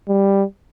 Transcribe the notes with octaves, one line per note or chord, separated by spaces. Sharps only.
G3